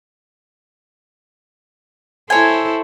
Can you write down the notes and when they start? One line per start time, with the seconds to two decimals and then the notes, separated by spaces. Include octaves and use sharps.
2.30 E4 A4 C5 C#5 G#5